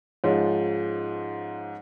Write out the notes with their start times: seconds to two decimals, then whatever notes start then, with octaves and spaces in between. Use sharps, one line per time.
0.24 G#2 F3 G#3 C#4 F4